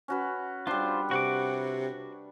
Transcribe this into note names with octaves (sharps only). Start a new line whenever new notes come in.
C#4 F#4 B4
G3 D4 F4 C5
C3 F#4 F#5 D6